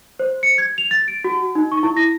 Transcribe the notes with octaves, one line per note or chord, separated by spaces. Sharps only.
C5
C#7
G#6
F7
A6
D7
F#4
D#4
C#6
E4
A#6